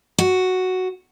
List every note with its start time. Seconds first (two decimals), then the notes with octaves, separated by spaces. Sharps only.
0.18 F#4